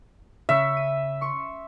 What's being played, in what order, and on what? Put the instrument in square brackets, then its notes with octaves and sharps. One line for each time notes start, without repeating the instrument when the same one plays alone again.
[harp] C#3 C#6 [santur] E5
[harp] D#7
C6 C#6